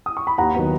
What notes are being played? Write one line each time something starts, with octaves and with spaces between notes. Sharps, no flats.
D#6
C#6
B5
D#2 F#5 A#5
D#3 F#3 B3